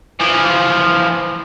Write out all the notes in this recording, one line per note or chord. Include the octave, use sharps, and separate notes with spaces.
E3 F3